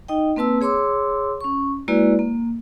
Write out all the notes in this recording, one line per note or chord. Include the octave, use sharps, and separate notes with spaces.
D#4 D#5 G5
A#3 C4 B4 A5 E6
G#4 C#5 C6 D6 E6
C#4 C#6
G#3 A#3 E4 F#4 B4 D5
A#3